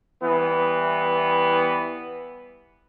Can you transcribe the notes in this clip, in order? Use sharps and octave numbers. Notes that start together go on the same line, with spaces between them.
E3 G3 B3